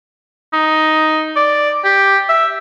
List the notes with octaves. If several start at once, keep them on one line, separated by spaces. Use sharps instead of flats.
D#4
D5
G4
E5